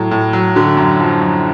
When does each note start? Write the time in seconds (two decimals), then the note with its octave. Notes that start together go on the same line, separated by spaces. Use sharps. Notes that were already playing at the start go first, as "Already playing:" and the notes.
Already playing: A2 F#3
0.11 A2
0.33 F#3
0.56 D3
0.77 F#2
1.00 F3
1.22 F#2